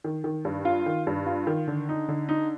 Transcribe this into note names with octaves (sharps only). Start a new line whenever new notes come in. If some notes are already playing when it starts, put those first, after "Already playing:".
D#3
D#3
G2
F4
D#3
G2
F4
D#3
D3
D#4
D3
D#4